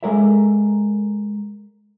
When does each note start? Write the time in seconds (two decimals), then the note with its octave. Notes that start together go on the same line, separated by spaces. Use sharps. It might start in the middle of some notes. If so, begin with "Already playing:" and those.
0.03 G#3 A4 A#4 C#5 E5